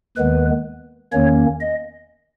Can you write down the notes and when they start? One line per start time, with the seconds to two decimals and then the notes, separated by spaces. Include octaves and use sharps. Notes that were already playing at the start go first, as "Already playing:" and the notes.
0.16 D#2 D#3 G#3 B3 B4
1.12 E2 D#3 A#3 C#4 C#5
1.60 D#5